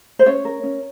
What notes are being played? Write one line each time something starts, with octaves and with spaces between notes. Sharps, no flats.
C5
C#4 C#5
A#4
C#4